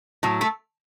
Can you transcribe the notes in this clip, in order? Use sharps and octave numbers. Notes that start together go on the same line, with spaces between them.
A2 F#3
A3 A4